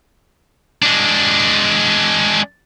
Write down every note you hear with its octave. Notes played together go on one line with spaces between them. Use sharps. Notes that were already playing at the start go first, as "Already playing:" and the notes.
G#3 D4